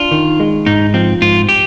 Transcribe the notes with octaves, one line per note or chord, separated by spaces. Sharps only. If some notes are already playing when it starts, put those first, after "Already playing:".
Already playing: D4 F4
D#3
G#3
G#2 D#4
F3 C4
G#2 F4
G4